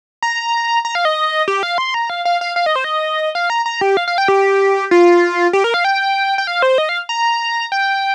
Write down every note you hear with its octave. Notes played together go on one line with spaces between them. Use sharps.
A#5
A#5
F5
D#5
G4
F5
C6
A#5
F5
F5
F5
F5
D#5
C5
D#5
F5
A#5
A#5
G4
F5
F5
G5
G4
F4
G4
A#4
F5
G5
G5
F5
C5
D#5
F5
A#5
G5